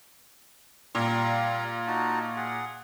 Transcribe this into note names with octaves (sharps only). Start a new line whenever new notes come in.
A#2 G3 F5 A#5
D#4 F#4 A5
G#4 F#5